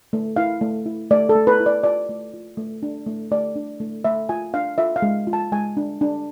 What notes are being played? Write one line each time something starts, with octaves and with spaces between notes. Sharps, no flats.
A3
E4 F5
A3
E4
A3 D5
A4
A3
B4
E4
D5
F4 D5
A3
F4
A3
D4
A3
A3 D5
D4
A3
A3 E5
F4 G#5
D4 F5
F4 E5
F5
G#3
F4
A5
G#3 G#5
D4
D4